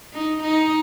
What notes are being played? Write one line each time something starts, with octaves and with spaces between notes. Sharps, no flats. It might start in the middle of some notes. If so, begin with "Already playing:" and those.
D#4
D#4